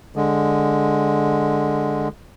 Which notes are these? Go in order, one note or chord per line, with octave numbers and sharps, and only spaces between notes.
D3 G#3